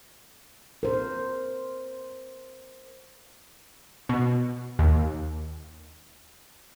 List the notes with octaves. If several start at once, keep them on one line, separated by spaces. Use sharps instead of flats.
A#4 C5
B2
D#2